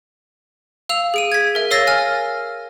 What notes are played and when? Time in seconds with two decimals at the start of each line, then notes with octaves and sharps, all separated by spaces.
0.89 F5 E6 F7
1.14 G#4 D7 D#7
1.32 G#6 B6
1.55 A#4 E5
1.71 A#4 C#5 F5 E6 A6 A#6
1.87 G#5 F6